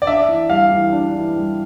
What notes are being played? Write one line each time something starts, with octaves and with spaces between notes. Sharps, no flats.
D5
D4 E5
E3
G3 F5
E3
D4
E3
G3